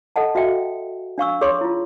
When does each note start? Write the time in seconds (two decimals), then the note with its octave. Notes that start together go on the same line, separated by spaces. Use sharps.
0.16 A4 D#5 F#5 A5
0.35 F#4 E5 F5 G5
1.18 D4 F5 C#6 E6
1.41 G#4 C#5 C6 C#6
1.61 E4 F4